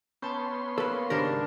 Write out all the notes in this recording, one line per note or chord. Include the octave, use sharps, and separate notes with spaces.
B3 C#4 A5 C6 G6
A#3 A4 B4
G#1 C#2 D4 G4 A#4 F6